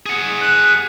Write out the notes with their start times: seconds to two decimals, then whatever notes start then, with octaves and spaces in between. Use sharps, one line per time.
0.06 G#4 F#5
0.41 F#6